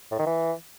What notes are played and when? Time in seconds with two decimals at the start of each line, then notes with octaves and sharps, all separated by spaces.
0.12 A2
0.19 D#3
0.27 E3